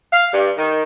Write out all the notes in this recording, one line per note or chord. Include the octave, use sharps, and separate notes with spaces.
F5
G2
D#3